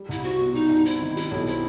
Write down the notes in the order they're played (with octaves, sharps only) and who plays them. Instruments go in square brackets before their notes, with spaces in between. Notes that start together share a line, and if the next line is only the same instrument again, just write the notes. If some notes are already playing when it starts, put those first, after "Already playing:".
Already playing: [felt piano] G3
[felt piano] C2 [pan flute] E4
[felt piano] C4 [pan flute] F#4
[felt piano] B2
[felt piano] G3 [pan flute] D#4
[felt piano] G2
[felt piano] C4 [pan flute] E4
[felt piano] D#3
[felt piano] G3 [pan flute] E4
[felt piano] B1
[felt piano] C4 [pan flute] E4